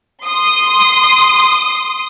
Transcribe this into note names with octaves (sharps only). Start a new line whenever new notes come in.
C6 D#6